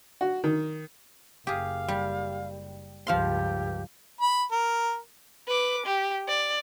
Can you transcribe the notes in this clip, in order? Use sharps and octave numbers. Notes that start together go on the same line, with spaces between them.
F#4
D#3
F#1 G4 G#4 F5
G3
C#2 G2 F3 G4 F5 C6
B5
A#4
B4 D6
G4
D5